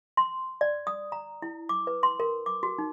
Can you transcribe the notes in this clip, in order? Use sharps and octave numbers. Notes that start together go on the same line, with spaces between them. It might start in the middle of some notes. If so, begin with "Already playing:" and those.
C6
D5
D#6
A#5
E4
D6
B4
C6
A#4
D6
F#4
D#4